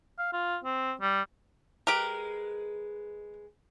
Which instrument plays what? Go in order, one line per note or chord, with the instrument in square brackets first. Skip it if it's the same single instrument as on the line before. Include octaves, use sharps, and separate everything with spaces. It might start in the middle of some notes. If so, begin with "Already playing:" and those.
[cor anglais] F5
F4
C4
G3
[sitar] G#3 B4 [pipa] G4 A#4